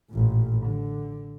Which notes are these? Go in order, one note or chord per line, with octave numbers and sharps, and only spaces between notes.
A1 A#2
D3